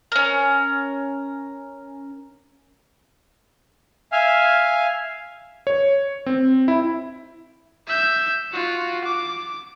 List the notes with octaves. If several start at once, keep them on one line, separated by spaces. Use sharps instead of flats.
C#4 A#4
E5 F5 G#5 F6
C#5
C4
E4
E5 G6
F4 F#4
D6